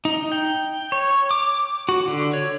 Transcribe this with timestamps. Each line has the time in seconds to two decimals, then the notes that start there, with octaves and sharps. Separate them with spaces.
0.05 D#4
0.32 G5
0.92 C#5
1.31 D6
1.89 F#4
2.08 D3
2.33 C#5